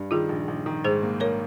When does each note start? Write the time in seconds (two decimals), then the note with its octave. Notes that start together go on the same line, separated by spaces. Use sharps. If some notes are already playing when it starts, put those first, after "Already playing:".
Already playing: G2
0.11 D#3 F4 G#4
0.29 A#1
0.48 A#1
0.66 D#3
0.84 G#2 G#4 C5
1.02 A#3
1.20 A#3 A#4 C#5